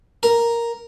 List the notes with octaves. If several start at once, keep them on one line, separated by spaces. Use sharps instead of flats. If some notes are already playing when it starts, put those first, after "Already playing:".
A#4